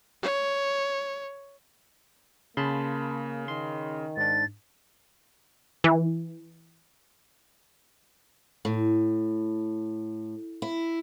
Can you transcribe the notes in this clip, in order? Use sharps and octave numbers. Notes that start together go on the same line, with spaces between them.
C#5
C#3 A#3 A5 B5 C6
D#3 C6
G#2 D4 A6
E3
A2
E4